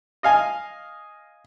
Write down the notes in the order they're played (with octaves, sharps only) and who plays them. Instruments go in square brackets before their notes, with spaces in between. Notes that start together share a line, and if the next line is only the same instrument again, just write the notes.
[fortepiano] D#5 F5 G#5